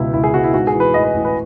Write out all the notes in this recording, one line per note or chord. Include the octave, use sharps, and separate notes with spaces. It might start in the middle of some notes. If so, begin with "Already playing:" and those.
Already playing: C#2 B2 E4
C#2 E4
G#4
B2 F#4
E4
G#2 F#4
G#4
E3
B4
A1 D#5
B4
A1
B4